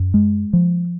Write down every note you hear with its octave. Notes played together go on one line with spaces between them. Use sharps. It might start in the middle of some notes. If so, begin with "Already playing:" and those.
Already playing: F#2
G#3
F3